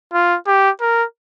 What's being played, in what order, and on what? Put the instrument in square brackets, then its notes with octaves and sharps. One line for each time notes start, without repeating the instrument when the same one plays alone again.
[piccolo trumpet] F4
G4
A#4